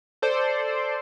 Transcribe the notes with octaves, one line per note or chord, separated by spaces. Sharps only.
A4 C5 D5